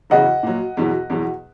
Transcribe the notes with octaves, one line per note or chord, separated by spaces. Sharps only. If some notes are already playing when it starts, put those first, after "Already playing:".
E2 C#3 F#3 D#5 F#5
A#2 F#3
E2 B2 F#3
E2 B2 F#3